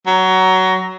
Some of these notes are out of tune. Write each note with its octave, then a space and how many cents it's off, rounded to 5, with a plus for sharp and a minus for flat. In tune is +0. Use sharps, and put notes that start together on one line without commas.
F#3 +15